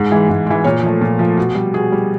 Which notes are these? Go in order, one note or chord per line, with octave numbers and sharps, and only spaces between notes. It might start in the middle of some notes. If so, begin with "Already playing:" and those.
Already playing: G#2
E3 G#3
G#2
E3 G#3
A#2 C#5
F3 A3
A#2
F3 A3
B2
G3
B2 G#4
G3